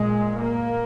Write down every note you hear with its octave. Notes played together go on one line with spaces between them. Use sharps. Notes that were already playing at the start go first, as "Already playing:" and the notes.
Already playing: A#2 G#3
A#3